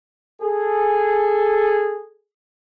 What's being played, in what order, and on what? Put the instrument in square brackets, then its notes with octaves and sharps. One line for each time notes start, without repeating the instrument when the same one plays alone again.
[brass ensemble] G#4 A4